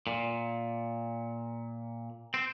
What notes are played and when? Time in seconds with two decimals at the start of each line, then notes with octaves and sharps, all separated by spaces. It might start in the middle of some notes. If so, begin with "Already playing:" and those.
0.07 A#2
2.34 C4